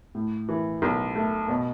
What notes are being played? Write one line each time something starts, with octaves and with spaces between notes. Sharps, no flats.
A2
E3
B1
A3
B2